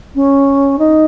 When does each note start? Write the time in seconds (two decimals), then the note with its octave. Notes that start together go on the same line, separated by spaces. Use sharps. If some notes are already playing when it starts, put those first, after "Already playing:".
0.15 C#4
0.79 D#4